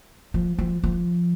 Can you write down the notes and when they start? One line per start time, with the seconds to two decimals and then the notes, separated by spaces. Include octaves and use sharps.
0.34 F3
0.59 F3
0.83 F3